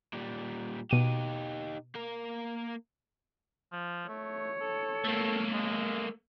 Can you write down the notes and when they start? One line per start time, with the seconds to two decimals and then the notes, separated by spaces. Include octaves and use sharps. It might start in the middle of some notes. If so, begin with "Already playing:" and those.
0.13 A#2 G3
0.91 B2 D#4 G4 D#7
1.95 A#3 A#4
3.72 F3
4.08 A3 C#5
4.61 A4
5.04 A3 A#3
5.53 G#3